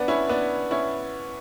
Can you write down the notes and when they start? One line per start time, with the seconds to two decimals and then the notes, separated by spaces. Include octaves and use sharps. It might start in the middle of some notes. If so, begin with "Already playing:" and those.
Already playing: B3 D4
0.08 C#4 E4
0.29 B3 D4
0.71 C#4 E4